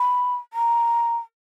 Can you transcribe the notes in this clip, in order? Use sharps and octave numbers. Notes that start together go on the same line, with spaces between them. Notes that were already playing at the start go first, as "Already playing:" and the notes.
Already playing: B5
A#5